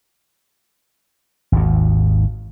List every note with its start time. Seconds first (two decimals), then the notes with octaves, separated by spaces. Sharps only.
1.52 G#1 D#2